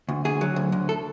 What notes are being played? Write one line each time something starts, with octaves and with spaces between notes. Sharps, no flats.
D2
D2 G#4
F#3
D2
D2
A4